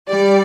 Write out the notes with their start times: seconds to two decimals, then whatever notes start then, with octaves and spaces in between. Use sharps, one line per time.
0.09 G3 D5